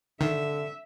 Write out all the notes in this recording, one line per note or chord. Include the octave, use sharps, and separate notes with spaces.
D3 D#3 E5